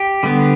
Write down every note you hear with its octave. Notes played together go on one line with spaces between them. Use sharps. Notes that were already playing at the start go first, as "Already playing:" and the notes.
Already playing: G4
D3 G3 B3